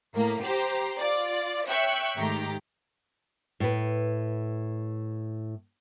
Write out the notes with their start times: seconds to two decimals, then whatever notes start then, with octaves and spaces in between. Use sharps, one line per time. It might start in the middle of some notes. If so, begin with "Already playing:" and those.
0.14 A2 A#3
0.43 G4 C5 A#5
0.99 F4 D5
1.66 C#5 E5 G5 C#6 F#6
2.17 G#2 D#3 A3 G4 A#5
3.60 A2 B4